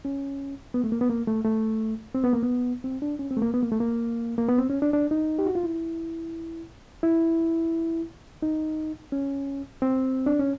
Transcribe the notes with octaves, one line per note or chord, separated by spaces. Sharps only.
C#4
B3
A3
A#3
B3
A#3
A3
A3
C4
B3
A#3
B3
C4
D4
C#4
C4
A3
A#3
B3
A#3
A3
A#3
A#3
B3
C4
C#4
D4
D4
D#4
G4
F#4
F4
E4
E4
D#4
C#4
C4
D4
C#4